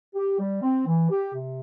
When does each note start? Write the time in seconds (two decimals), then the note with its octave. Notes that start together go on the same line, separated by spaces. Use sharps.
0.15 G4
0.40 G3
0.63 C4
0.87 E3
1.10 G4
1.34 C3